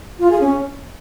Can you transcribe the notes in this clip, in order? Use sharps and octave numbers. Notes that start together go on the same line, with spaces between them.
F4
G#4
C#4